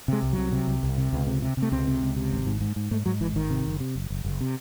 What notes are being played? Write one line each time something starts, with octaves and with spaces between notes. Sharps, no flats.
C3 G#3
C2
C3 F#3
C3
C2
C2
C3
C#2
C3
C3
C3
A3
C#2 C4
C3
C#2
C3
G#1
G#2
G#2
G#2
G#2 A3
G#2 F#3
G#1 E3
G#1 D#3
C3
F#1
C3
F#1
F#1
F#1
C3